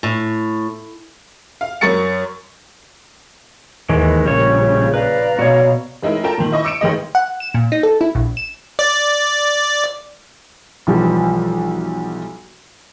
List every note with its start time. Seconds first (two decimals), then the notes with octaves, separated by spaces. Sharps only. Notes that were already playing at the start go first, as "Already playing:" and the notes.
0.03 A2
1.61 F5
1.81 F#2 A#4 C#6 A6 C#7
3.89 D#2 G#2 D#3 E3 G#3 A#4
4.26 A#1 C#3 G3 C#5 C#6
4.94 B4 D5 F5 A#5
5.39 B2 F#4 C#5
6.03 A1 G#3 D#4 E4 A#4
6.23 F4 A4 A#4 G5 A5 A#5
6.38 A#2 D#3
6.52 E4 D#5 C#6
6.64 D6 E6 C#7 D7 E7
6.81 A1 D#3 G#3 D#5
7.15 F#5
7.40 E7
7.54 A#2
7.72 D#4
7.83 A4
8.01 E4
8.15 A#1
8.37 E7
8.79 D5
10.87 B1 E3 F3 G3